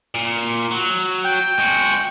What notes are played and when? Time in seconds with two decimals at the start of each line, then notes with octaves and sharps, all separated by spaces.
0.14 A#2
0.71 F#3
1.24 G5
1.59 G#3 F#4